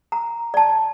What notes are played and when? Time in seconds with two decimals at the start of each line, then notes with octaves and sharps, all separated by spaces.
0.12 A#5
0.54 D5 A5